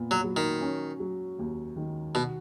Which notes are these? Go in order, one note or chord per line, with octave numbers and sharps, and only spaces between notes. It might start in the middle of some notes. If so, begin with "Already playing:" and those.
Already playing: A#2 B3
F#3
F#3
D#3
C#4
F#3
D#2
D#3
B2 F#4